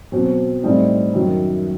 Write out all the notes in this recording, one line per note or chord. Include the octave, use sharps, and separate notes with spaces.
B2 F#3 C4 F#4 C5
A2 G3 C4 D#4
F#2 D#3 F#3